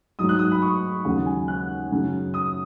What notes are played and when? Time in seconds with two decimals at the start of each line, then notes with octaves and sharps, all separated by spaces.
0.19 G#2 F#3 D#6
0.29 F#6
0.39 D#6
0.52 B5
0.62 C#6
1.05 D#2 C#3 F#3 F#5
1.26 G#5
1.48 F#6
1.91 F#2 C#3 F#3
2.34 D#6